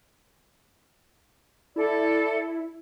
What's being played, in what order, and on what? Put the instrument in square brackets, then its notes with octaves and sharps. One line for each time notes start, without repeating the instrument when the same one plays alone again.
[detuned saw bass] E4 [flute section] A4 D5